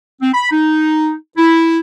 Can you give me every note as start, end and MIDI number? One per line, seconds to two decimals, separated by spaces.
0.21 0.30 60
0.34 0.50 83
0.51 1.13 63
1.37 1.80 64